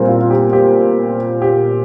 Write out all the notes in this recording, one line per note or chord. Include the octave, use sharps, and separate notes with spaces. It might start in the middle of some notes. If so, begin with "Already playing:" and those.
Already playing: A#2 G3 C4 A#4 C5
F4
F4
G4
G4
G4